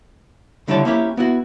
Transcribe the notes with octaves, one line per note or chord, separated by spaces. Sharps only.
C#2 D3 G3 E4 C#5 A5
A#3 C4 C#4 E4 G4
B3 E4 F#4